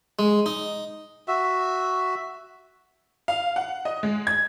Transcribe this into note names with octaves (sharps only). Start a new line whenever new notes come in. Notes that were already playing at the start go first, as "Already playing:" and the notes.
G#3
D#4
F#4 E5
F5
F#5
D#5
G#3
G#6